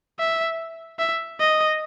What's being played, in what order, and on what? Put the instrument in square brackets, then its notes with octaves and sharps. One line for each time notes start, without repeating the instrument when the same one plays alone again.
[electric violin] E5
E5
D#5